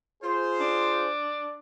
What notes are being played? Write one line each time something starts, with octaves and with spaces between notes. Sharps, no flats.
F4 G#4 C5
D4